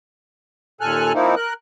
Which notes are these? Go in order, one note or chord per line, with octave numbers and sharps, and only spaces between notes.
D#2 A#2 A4 G#5 F6 F#6
F3 A#3 C4 D#4 E4
A#4 F#6